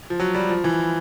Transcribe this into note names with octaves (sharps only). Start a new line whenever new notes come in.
F3
F#3
G3
F3
E3